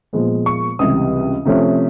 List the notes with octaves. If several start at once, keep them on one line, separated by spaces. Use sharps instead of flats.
A#2 F3 G#3 B3
C#6
C#2 C3 E3 G3 D#6
C3 F3 A3 C#4